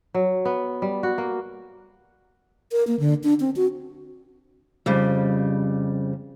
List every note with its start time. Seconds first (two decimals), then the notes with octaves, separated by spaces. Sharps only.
0.14 F#3
0.45 B3
0.82 G3
1.03 F#4
1.18 A#3
2.72 A#4
2.87 A#3
3.00 D3
3.24 D4
3.40 C4
3.56 F#4
4.86 F2 C#3 G3